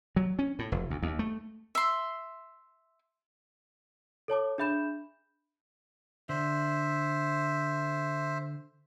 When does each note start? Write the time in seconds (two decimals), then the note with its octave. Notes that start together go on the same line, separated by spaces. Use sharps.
0.16 F#3
0.39 C#4
0.59 A2
0.72 F1
0.90 D2
1.03 D#2
1.19 A3
1.75 E5 C6
4.28 A4 C#5 A5 D6
4.58 D4 G#4 E5 B5 G6 E7
6.29 D3 C5 E5